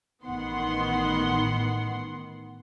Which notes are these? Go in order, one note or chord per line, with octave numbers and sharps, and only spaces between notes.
A1 D#3 B3 F#5 C6